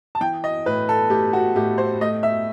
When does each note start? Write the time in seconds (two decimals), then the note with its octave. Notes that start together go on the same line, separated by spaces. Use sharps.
0.15 A5
0.21 E3 G5
0.44 D#5
0.66 A2 B4
0.89 A4
1.10 A3 G4
1.33 F#4
1.55 A2 G4
1.78 C5
2.01 A3 D#5
2.23 E5